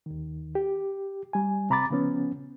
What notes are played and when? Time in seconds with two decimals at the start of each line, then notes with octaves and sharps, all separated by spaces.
0.06 D#2 D#3
0.55 G4
1.33 G3 G#5
1.70 C3 A#5 B5 D6 A6
1.91 C#3 F3 B3 C#4